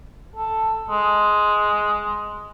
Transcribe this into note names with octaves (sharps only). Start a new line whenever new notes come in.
A4
G#3